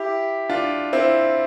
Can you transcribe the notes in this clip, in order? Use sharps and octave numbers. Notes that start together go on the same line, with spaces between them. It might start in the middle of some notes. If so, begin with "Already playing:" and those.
Already playing: E4 G4
D4 F4
C4 E4